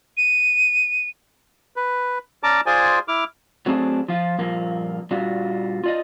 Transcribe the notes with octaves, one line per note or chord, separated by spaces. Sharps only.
D#7
B4
C#4 D5 A5 A#5 D6
F4 G#4 C5 D5 G#5
E4 D6 F6
F#3 A3 C4 D4 G#4
F3 F4
G2 A#2 F3 A#3
A#2 G3 D4 F4 F#4
F4 D5 D#5